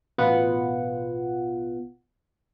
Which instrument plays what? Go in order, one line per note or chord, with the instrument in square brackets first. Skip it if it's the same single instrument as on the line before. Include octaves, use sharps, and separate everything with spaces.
[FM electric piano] A1 B2 B3 F4 F#5